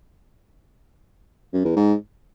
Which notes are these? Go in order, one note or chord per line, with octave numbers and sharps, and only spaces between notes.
F#2
E2
G#2